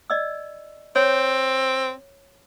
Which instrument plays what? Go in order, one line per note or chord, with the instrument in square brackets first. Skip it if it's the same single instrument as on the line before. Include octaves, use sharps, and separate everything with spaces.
[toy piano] D5 D#5 E6
[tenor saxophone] C4 [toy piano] C#5